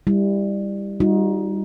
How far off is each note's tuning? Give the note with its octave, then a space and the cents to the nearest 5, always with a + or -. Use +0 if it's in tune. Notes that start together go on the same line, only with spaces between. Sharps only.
G3 +20 E4 +0
G3 +0 D#4 +15 F#4 -45